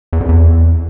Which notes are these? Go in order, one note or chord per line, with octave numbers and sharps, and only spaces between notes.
E2
F2
E2